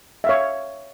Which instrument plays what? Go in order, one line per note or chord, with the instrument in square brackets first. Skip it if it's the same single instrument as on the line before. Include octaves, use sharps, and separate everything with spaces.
[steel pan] E5
F5
C#5